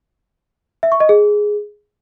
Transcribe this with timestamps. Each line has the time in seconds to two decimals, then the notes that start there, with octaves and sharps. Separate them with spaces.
0.83 E5
0.92 C#6
1.00 D#5
1.09 G#4